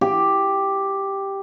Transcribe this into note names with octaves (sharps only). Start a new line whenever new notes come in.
G4